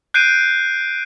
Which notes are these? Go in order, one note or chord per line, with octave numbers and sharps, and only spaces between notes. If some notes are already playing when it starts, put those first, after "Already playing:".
F#6 G6 C7 D7 D#7